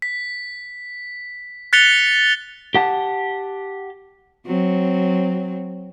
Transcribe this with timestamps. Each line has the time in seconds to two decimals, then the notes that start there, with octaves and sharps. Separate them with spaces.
0.02 B6
1.73 F#6 A6 B6 C#7 F7 G7
2.75 G4 F#5 A5
4.46 F#3 C4